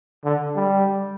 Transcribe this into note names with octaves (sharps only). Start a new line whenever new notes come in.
D3
G3